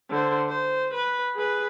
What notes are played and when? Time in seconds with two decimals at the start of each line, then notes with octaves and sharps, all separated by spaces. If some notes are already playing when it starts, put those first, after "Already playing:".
0.10 D3 C5
0.49 C5
0.93 B4
1.35 G#4 B4